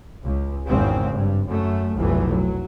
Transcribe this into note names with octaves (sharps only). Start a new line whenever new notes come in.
C#2
G#1 E2 C#3 G#3 C4
G2
F#2 A3
F1 B1 A2 E3 F#3 A3
F#3